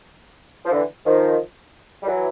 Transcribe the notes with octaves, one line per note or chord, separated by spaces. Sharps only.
F3
D3 E3
D#3 F3
G3
E3 F#3